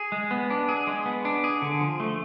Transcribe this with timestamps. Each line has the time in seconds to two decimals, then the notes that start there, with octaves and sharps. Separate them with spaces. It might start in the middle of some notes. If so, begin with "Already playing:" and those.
Already playing: G#4
0.12 G#3
0.31 B3
0.50 D4
0.69 G#4
0.87 G#3
1.06 B3
1.25 D4
1.44 G#4
1.62 D3
1.81 F3
2.00 A3